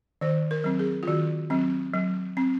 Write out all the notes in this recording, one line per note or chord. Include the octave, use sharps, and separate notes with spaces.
D#3 C5
A#4
F#3 C4
G#4
F4
D#3 F#4
F#3 C4
F#3
C4